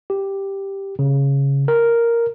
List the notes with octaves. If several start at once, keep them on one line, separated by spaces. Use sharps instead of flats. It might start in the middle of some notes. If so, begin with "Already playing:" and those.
G4
C#3
A#4